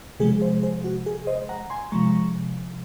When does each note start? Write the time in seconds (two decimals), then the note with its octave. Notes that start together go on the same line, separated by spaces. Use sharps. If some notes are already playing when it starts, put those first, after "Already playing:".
0.20 C3 F3 G#3 G#4
0.41 G#4 C5
0.63 G#4 C5
0.84 F#4
1.06 G#4
1.27 C5 D#5
1.49 F#5 A#5
1.70 G#5 C6
1.92 C3 F3 G#3 A#5 C#6